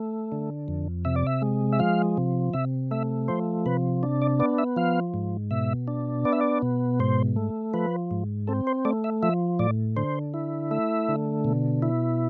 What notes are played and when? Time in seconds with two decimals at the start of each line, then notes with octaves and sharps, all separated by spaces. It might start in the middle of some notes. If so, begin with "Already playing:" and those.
Already playing: A3
0.32 D3
0.68 F2
1.05 C3 E5
1.16 D5
1.27 E5
1.42 G#3
1.73 E5
1.79 F3 F5
2.17 C3
2.53 C3 E5
2.91 A3 E5
3.28 F3 C5
3.66 C3 B4
4.03 D4
4.22 D5
4.39 B3 D5
4.58 E5
4.76 F3 F5
5.14 G#2
5.51 B2 E5
5.88 D4
6.25 B3 D5
6.32 E5
6.41 D5
6.62 B2
7.00 G#2 C5
7.36 A3
7.74 F3 B4
8.11 G#2
8.47 C4 A4
8.67 C5
8.85 A3 D5
9.04 E5
9.22 F3 E5
9.59 A2 D5
9.97 D3 C5
10.34 E4
10.71 A3 E5
11.09 D3
11.45 B2
11.82 E4